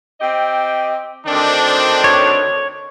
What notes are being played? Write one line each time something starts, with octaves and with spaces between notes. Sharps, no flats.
C4 G4 D#5
D2 D#3 C4 D4
C#5